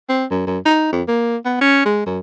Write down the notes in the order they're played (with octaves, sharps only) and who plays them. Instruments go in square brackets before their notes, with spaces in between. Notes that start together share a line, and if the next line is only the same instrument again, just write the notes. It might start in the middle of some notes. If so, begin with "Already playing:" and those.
[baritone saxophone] C4
F#2
F#2
D#4
F2
A#3
B3
C#4
G#3
F#2